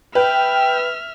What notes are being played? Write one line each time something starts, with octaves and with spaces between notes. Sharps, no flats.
B4 E5 G5 F6